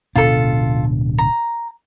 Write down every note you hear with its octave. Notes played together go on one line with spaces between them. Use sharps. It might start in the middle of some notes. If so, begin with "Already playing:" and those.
D1 B2 D4 F4 A4
A#5